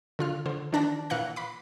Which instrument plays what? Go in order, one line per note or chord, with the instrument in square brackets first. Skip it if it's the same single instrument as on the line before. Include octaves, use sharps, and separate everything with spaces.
[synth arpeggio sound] D3 F4 F6
D3 C5
D#3 E3 D4 A5 A#6
A#2 E3 F5 F#5 F#6 A#6
B5 D6